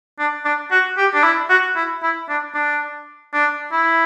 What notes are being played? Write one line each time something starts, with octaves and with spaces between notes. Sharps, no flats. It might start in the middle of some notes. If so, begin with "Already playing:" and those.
D4
D4
F#4
G4
D4
E4
F#4
E4
E4
D4
D4
D4
E4